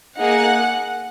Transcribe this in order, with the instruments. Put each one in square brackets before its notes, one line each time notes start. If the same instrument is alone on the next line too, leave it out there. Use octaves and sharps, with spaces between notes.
[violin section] A#3 D#4 G#4 F#5